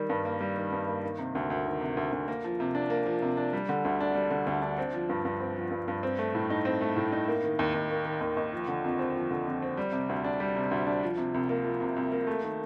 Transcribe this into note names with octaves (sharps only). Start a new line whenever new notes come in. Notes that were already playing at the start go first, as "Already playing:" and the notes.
Already playing: D#3 G3
G2
A#3
G3
D#3
G2
A#3
D#3
C3
D2
D2
D#3
C3
D2
D2
A#3
F3
C3
D4
A#3
F3
C3
D4
G3
D3
D2
D4
G3
D3
D2
D4
C4
F3
G2
G2
C4
F3
G2
G2
C4
A3
A2
D#4
C4
A3
A2
D#4
A#3
D#3
D#2
D#2
A#3
D#3
D#2
D#2
F3
D3
F2
C4
F3
D3
F2
C4
G3
C3
D2
D4
G3
C3
D2
D4
F3
C3
C2
A#3
F3
C3
C2
A#3
A3
D#3